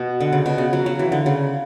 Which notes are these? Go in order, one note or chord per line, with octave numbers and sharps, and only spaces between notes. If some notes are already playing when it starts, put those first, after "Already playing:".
Already playing: B2
D3
C#3
B2
C#3
F#3
F#3
E3
D3
C#3